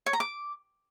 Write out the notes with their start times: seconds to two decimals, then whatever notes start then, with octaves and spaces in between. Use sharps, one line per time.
0.06 C#5
0.13 A#5
0.20 D6